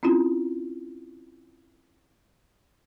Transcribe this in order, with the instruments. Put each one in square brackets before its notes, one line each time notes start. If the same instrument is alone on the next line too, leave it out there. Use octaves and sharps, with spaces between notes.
[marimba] C4 C#4 E4 F4